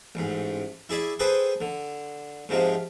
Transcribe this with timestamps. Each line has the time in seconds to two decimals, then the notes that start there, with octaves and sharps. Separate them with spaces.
0.15 A1 G#2
0.89 E4 G#4 D5 E5
1.19 G#4 A4 B4 C5 G5 D#6
1.61 D3
2.49 G#2 C3 F3 G#3